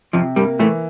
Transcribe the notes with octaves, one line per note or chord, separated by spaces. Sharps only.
F2 C3 F3
G2 G3 A#3
A2 E3 A3